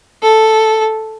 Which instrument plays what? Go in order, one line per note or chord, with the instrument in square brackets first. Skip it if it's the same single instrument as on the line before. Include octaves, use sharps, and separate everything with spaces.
[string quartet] A4